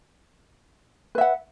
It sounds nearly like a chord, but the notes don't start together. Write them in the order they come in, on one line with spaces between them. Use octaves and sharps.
B4 E5 F#5